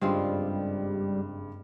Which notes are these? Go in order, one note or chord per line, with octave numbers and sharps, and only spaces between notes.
F#1 G2 G3 G#3 C4 F4